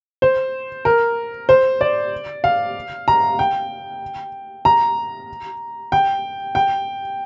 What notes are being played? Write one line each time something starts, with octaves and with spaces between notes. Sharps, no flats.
C5
A#4
C5
D5
F5
A#5
G5
A#5
G5
G5